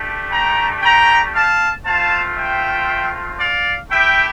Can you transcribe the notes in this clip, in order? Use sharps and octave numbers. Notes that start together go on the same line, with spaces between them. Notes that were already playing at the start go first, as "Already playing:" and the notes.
Already playing: A3 D4 G4
G5 A#5
G5 A#5
F5 A5
A3 C4 F4 F5 A5
E5 G5
D5 F5
A3 E4 G4 E5 G5